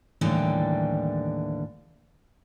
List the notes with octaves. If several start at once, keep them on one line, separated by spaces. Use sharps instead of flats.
D#2 A2 D3 E3 G3 G5